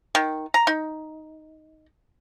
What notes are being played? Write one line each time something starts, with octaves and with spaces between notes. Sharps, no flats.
D#3
A#5
D#4